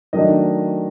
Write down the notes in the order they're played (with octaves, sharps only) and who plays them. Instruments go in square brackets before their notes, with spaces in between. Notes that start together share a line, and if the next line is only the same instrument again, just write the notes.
[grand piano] D#3 F#3 A3 D4 D#5